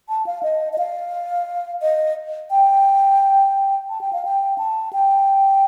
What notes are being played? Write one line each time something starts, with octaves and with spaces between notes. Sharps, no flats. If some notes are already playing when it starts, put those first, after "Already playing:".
A5
F5
D#5
D#5
F5
D#5
G5
A5
G5
F5
G5
A5
G5